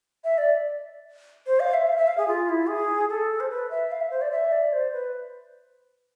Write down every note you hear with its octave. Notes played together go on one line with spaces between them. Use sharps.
E5
D5
C5
F5
E5
F5
E5
F5
G#4
F4
E4
G#4
A4
C5
B4
E5
F5
E5
C5
D5
E5
D5
C5
B4